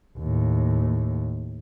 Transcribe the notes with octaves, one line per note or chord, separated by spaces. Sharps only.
D#2 A2